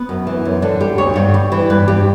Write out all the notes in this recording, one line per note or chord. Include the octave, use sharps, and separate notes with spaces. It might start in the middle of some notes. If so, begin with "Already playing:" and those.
Already playing: B3
F#2
E3
F#2
D3 D4
G3 G4
D2 C#5
G2
G3
E3
G2 B4
G2 G4